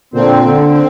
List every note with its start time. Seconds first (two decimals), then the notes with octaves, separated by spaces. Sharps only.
0.13 A#2 D3 C4
0.43 D3
0.70 C4